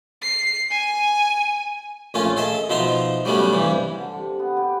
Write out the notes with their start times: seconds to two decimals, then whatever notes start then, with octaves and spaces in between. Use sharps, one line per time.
0.22 C7
0.70 G#5
2.14 A#1 A3 C#4 F4 G#5
2.37 G#4 A4 D#5 E5
2.69 B2 F3 D#4 E5 A#5 C6
3.25 F#3 G3 A3 B3 C#4
3.53 G2 C3 E3
3.94 D3
4.13 C3
4.39 B3
4.57 G4